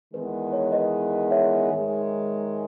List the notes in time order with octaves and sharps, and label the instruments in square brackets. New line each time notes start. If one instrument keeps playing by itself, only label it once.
[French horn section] E2 D#3 G#3 B3 [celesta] B4
[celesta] C#5
B4 D#5
C#5 E5
[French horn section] G#2 D#3 G#3 D#4